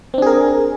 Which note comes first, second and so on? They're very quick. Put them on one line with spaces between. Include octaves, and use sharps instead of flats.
C4 D4 G#4 A#4